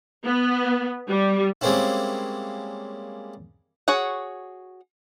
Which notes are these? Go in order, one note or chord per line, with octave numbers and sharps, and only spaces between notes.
B3
G3
G3 G#3 A#3 C4 C#4 E4
F#4 G#4 C#5 F#5